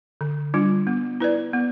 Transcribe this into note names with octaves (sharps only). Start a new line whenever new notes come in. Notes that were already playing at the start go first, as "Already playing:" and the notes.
D3
G3 D4 F4
B3
E4 B4 D5
B3